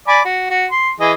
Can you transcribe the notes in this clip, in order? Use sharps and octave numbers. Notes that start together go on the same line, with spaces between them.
D5 G#5 B5
F#4
F#4
C6
E3 G#4 D#5